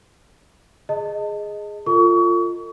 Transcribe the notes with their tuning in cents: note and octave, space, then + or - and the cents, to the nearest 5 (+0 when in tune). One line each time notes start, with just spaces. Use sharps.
G#4 +0 D#5 +0 A5 +30
F4 +0 A4 +40 C#6 +35